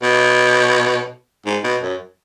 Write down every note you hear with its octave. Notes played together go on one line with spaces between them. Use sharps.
B2
G#2
B2
F#2